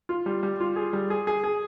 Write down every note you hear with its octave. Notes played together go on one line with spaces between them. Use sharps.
F4
G3
G3
F4
G#4
G3
G#4
G#4
G#4